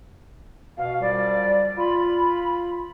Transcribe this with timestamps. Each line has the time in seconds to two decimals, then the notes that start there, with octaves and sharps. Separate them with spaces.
0.78 B2 F5
1.01 F#2 F3 G3 D5
1.78 F4 B5